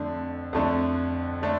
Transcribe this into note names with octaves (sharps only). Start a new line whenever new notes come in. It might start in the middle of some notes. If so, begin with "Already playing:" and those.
Already playing: F2 D3 A3 D4
F2 D3 A3 D4
D3 A3 D4